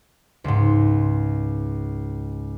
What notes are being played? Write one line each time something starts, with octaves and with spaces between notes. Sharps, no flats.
C#2 G#2